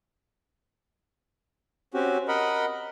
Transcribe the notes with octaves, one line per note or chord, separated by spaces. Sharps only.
C4 C#4 F#4 G4
A#4 D#5 F#5 B5